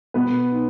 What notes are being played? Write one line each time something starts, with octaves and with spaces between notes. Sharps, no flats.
B2 B3 B4
D#4